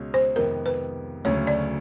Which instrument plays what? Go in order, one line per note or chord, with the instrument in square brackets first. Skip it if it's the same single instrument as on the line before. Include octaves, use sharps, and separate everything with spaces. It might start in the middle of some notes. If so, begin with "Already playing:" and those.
Already playing: [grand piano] C#2 B2 G#3 C#4
[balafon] C5
[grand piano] F2 C3 D#3 G#3 B3 [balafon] A#4
[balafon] B4
[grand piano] D2 C#3 F#3 A3 C#4 [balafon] C#5
[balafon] D5